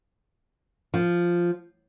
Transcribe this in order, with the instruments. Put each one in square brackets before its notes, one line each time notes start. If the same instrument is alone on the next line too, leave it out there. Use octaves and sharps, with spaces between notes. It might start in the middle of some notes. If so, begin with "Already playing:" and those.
[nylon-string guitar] F3